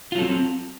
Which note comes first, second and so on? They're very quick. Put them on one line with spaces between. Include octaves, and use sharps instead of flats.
F4 F#3 A4 C4